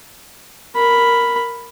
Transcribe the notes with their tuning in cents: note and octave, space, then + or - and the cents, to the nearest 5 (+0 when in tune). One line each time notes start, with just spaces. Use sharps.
A#4 +0 B5 +0